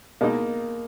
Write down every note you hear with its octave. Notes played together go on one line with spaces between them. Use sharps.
B2 G#3 A#3 D#4